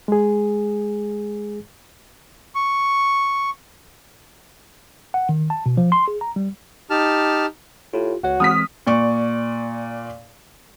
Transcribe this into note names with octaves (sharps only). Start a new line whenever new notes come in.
G#3 G#4
C#6
F#5
D#3
A5
B2
F3
C6
G#4
A#5
G3
D#4 G4 A5 F6
A2 F4 G4
C#2 F#4 C#5
E3 G#3 C4 D#6 F6 B6
A#2 D5 C#6